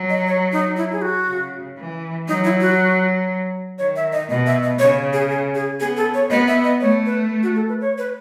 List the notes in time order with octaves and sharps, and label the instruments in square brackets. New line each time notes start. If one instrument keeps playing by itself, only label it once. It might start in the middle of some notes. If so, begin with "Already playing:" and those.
Already playing: [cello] F#3
[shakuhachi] D#5
C#5
D#4
E4
G#4
F#4
[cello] C#3
E3
[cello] F#3 [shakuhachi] D#4
[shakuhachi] E4
F#4
[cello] D#3 [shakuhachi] C#5
[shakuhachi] E5
D#5
[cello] B2 [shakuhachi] D#5
[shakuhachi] E5
D#5
[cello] C#3 [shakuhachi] C#5
[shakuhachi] G#4
G#4
G#4
[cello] B3 [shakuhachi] G#4
[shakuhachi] A4
C#5
[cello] B3 [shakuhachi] D#5
[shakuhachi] E5
D#5
[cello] A3 [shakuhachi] C#5
[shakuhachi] B4
F#4
A4
B4
C#5
B4